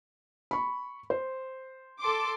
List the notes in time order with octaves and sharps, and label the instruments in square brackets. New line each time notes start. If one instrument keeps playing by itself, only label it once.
[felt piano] B5 C#6
C5
[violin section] A4 C6 D6